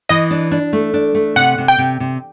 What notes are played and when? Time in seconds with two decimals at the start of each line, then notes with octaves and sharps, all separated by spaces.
0.09 E3 D#5
0.31 D4
0.51 D4
0.73 A3
0.94 D4
1.15 A3
1.36 C3 F#5
1.58 C3
1.68 G5
1.78 C3
2.00 C3